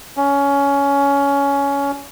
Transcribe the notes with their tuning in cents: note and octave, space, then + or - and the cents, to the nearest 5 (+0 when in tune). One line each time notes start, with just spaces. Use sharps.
C#4 +15